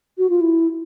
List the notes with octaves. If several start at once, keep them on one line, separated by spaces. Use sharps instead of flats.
F#4
F4
E4